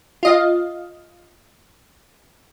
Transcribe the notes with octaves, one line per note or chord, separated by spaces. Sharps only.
F4 D#5 F5